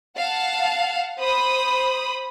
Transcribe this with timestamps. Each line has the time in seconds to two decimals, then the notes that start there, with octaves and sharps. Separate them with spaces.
0.16 F5 F#5 A5
1.18 C5 B5 D#6